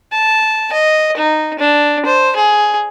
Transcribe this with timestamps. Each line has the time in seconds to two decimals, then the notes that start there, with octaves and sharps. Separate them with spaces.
0.12 A5
0.73 D#5
1.17 D#4
1.59 D4
2.06 C5
2.36 G#4